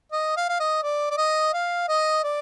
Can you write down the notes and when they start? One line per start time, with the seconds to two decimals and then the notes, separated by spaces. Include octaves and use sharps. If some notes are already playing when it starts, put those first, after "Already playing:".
0.12 D#5
0.37 F5
0.49 F5
0.60 D#5
0.83 D5
1.11 D5
1.18 D#5
1.54 F5
1.89 D#5
2.24 D5